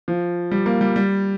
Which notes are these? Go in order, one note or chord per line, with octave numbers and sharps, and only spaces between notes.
F3
G3
A#3
G3
G3